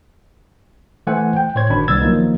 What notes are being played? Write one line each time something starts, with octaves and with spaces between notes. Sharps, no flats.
E3 A3 C5 F#5 G#5
G5
A2 C5 C#5 G#6
G1 D#3 D4 F#4 B5
C2 B3 E6 G#6 A6
D#3 F3 F#3 A#3 D#4